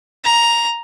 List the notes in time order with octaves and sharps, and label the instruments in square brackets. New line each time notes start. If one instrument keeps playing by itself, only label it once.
[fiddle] A#5